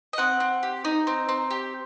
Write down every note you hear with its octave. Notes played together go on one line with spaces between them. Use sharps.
D#5
C4 F#5
C4
G4
D#4
C4
C4
G4